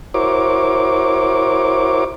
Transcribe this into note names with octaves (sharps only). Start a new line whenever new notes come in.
E4 F#4 A#4 C5 C#5 D6